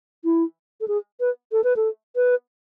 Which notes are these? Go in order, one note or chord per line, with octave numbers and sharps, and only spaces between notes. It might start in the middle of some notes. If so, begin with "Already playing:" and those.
E4
A4
G#4
B4
A4
B4
A4
B4